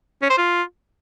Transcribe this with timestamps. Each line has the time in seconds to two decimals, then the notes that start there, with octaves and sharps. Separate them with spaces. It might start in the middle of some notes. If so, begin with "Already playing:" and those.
0.22 C#4
0.30 C5
0.38 F4